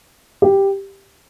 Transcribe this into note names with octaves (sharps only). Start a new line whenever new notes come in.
G4